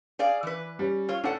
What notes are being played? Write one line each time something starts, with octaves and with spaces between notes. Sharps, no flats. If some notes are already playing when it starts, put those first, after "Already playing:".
G#4 D5 F5
E3 B4
G3 C#4
F4 C#5
A2 C#4 D4 A4 F#5